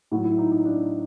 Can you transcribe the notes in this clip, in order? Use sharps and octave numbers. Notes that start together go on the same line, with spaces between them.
A2 F#3 F#4
E4
D#4
D#4
D4